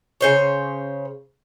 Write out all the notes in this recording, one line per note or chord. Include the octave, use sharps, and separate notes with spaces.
C#3 C5 C#5